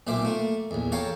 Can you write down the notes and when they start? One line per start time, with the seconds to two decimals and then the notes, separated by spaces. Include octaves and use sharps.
0.07 B1 A#2 C5 E5 D6
0.25 A3 A#3
0.71 A#1 E2
0.92 A4 C#5 F5 G5 G#5 A#5